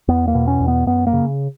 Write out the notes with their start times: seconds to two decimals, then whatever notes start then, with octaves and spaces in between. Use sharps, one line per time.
0.08 E2 B3
0.28 A#3
0.35 B2
0.47 C#4
0.60 E2
0.68 B3
0.86 F#2 B3
1.07 A#3
1.13 C#3